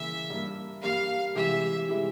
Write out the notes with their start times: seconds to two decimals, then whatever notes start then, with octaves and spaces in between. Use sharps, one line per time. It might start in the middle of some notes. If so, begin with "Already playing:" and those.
Already playing: C#3 E3 A#3 E5
0.30 G2 G3 A#3
0.83 G2 G3 A#3 F5
1.35 C3 E3 G#3 E4 G4 E5
1.89 C3 E3 G#3 E4 G4